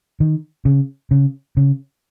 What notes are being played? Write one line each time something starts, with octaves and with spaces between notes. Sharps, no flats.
D#3
C#3
C#3
C#3